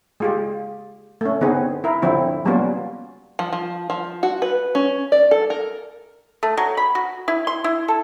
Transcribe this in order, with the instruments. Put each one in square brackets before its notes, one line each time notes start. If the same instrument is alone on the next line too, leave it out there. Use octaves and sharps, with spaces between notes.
[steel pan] G#3 F4 G4
A3 C#4
D3 B3 C4 D#4 G#4
E4 A#4
D3 F3 C4 E4
F#3 G3 A#3 B3 C#4 F4
[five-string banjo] F3
F3
F3
F#4
B4
C#4
D5
A4
A#4
[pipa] A3
F#3
B5
F#4
E4
C6
E4
A4